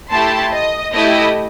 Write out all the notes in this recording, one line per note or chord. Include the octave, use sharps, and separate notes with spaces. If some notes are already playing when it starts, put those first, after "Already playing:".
A3 E4 G4 A5 C6
D#5
A3 E4 G4 D#5